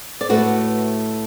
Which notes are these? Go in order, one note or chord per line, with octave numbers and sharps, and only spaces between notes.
D5
A2 A3 F#4 B4